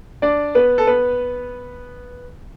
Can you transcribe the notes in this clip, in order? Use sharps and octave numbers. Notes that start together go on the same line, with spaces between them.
D4 D5
B3 B4
A4
B3 B4